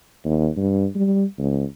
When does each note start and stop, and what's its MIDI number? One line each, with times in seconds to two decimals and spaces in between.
0.25 0.48 39
0.56 0.87 43
0.95 1.25 55
1.38 1.64 37